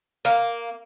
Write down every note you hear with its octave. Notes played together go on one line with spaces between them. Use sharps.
A#3